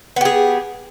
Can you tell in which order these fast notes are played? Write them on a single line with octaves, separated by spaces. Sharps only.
B3 G4 G#4